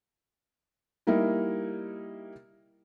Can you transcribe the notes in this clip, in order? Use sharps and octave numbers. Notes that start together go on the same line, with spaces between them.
G3 A#3 D#4 E4